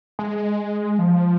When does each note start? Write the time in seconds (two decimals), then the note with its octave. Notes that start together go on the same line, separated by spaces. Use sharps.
0.19 G#3
0.99 F3